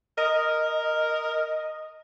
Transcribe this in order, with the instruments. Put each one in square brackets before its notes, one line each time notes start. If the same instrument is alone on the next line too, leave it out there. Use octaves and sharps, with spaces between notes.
[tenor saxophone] A#4 [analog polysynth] D#5